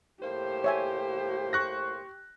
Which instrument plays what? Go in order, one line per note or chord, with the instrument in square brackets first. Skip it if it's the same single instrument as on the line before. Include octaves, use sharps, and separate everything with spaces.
[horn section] A2 A#3 C5 [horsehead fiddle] G4
[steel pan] C#5 E5 G#5
[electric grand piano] C#6 F#6 A#6